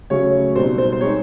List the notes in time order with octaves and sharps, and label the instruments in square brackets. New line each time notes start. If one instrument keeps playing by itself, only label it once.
[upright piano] C#3 F#3 A3 [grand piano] C#5
[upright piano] B2 G3 C4 D#4 [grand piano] C5
[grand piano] C5
C5
[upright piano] G#3 C4 D#4 [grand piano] C#5